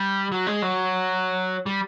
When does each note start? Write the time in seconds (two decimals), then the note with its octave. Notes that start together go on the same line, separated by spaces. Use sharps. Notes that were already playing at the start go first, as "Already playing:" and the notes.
Already playing: G3
0.32 F#3
0.47 G#3
0.62 F#3
1.66 G3